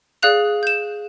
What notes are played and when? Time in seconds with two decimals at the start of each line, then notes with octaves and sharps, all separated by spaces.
0.23 G#4 D5 F5 F#6 F7
0.63 G6 E7